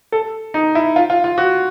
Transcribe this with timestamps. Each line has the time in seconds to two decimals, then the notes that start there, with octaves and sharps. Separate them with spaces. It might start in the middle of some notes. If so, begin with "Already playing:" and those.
0.12 A4
0.54 D#4
0.75 E4
0.96 F4
1.10 F4
1.24 F4
1.38 F#4